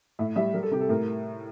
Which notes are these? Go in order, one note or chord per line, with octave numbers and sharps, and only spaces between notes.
A2 E5
G3 E5
G3 A#4
A4
C3 G4
A4
A2 A#4